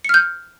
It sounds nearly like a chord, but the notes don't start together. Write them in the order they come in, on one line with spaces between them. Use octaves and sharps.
C#7 F6 G6